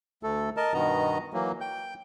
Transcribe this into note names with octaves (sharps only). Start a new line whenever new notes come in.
D2 A3 A4
A#4 D#5 A5
G2 B2 D#3 B3 D#5 A#5
E3 F#3 A#3
G5 G6